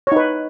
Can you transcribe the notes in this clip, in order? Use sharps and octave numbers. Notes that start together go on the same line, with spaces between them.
D#4 B4 C#5